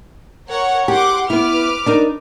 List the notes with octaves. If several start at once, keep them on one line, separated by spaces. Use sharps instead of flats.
A#4 C#5 F#5
G4 F#5 C6 D6
B3 E4 B4 D6 F6
D4 D#4 A#4